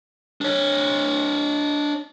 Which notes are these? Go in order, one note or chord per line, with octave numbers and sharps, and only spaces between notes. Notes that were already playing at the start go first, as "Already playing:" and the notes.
D4 C#5